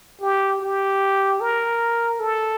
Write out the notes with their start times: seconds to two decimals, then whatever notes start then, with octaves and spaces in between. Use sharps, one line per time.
0.21 G4
0.61 G4
1.41 A#4
2.20 A4